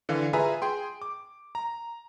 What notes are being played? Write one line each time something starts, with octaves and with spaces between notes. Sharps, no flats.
D3 E3 F5
F4 G#4 B4 E5 G#5 A#5
G#4 G5 C6
D6
A#5